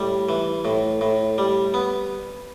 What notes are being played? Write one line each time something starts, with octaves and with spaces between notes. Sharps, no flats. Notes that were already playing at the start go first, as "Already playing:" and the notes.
Already playing: A2 G3
E3
A2
A2
G3
B3